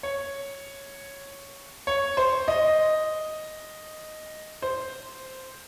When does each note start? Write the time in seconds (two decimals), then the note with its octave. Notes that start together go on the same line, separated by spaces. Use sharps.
0.03 C#5
1.87 C#5
2.17 C5
2.48 D#5
4.62 C5